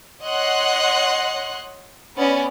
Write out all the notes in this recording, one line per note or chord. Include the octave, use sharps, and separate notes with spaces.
C#5 D#5 F#5 C6 F#6
B3 C#4 D5